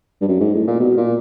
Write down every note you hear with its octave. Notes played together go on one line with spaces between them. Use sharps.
G2
F#2
G#2
A2
A#2
B2
A#2